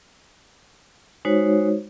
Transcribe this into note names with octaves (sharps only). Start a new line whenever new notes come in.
G#3 D#4 F#4 C5 C#5